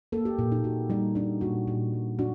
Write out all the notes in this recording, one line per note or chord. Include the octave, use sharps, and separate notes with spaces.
A#3 A4
G4
A#2
D#4
A#2 F#4
G3 D#4
D4 D#4
A#2 F#4
A#2
G3
D4 F#4